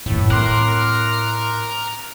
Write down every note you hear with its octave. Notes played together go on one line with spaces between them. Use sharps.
F#2 A2 E3
C4 A#4 C6 D6 F#6